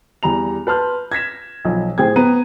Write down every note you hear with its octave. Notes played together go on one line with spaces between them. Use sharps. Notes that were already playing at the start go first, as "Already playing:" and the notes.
E2 G3 A#5 F7
B4 A5 C6 F6 G6
G#6 A#6 B6 E7
B1 F3
A2 G#4 C5 G5 G#6
B3 A#5 D#7